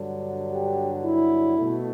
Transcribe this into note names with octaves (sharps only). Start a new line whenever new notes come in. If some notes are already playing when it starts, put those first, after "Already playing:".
Already playing: G2 D3 F#3
G4
E4
B2 A3